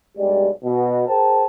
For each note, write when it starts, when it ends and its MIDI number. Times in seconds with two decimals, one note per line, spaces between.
0.18 0.49 35
0.18 0.49 43
0.18 0.49 56
0.18 0.49 67
0.18 0.49 74
0.64 1.03 47
1.07 1.46 68
1.07 1.46 70
1.07 1.46 72
1.07 1.46 79
1.07 1.46 81